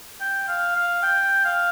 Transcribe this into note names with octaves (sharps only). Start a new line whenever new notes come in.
G5
F5
F5
G5
F5